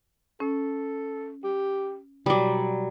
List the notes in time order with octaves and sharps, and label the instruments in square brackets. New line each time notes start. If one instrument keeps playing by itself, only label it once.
[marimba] C#4 [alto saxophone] A4
[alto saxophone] G4
[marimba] B2 G5 D6 [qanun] F#3 G3 [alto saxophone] D5